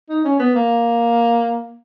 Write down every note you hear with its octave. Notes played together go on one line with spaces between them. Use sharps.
D#4
C#4
B3
A#3